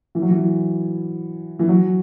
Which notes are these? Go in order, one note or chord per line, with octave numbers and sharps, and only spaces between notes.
E3
F#3
E3
E3
F#3